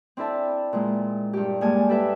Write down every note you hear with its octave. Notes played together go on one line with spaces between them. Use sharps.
C4 D4 E4 A4 E5 A5
A#2 G#3
G2 G4
G2 G#3 A#3 G#5 A5 D6
G4 A4 B4 E5